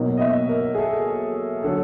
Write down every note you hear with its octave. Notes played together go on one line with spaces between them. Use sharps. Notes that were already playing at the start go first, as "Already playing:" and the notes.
Already playing: B2 F#3 A#3 D#4
D#5
E5
A#4
G#4
A4
D3 F#3 A4